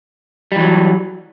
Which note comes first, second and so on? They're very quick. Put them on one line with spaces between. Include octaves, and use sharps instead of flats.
G3 E3 F#3